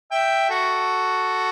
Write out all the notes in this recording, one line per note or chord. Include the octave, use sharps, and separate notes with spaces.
E5 G5
F#4 A4